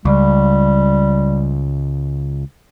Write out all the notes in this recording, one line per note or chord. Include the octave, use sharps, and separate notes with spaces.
C#2 G3